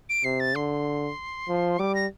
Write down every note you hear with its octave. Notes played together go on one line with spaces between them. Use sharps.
D7
C3 C7
A6
D3 C6
F3
G3 D6
A#6